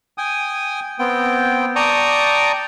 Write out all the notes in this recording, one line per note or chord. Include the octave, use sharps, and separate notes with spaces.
G5 G#5 D#6
B3 C4 G5
D5 G5 A5 A#5 C#6 D#6